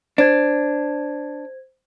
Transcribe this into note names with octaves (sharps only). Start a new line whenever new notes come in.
D4 C5 G#6